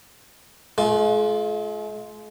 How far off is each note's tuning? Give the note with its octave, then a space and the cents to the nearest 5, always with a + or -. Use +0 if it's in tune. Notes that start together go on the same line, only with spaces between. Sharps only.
G#3 +45 F4 +0